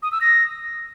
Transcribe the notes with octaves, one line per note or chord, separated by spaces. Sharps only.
D#6
E6
A#6